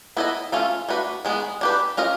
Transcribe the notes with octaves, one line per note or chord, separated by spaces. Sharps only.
B3 E4 A4 C5 D#5
A3 C#4 F4 A4
A3 D4 F#4 B4
D#3 G#3 B3
D4 G4 B4
C#4 F4 A#4 D#5